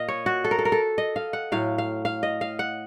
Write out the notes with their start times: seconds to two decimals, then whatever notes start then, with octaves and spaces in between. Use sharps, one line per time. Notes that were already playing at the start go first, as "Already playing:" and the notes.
Already playing: A#2 D#5 F5
0.08 C#5
0.26 F#4
0.44 A4
0.51 A#4
0.59 A4
0.65 A#4
0.72 A4
0.98 D#5
1.16 F5
1.33 F#5
1.52 A2 F#3 F5
1.78 F5
2.05 F5
2.23 D#5
2.41 F5
2.59 F#5